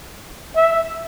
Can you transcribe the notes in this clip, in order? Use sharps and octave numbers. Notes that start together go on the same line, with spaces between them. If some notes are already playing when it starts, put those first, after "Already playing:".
E5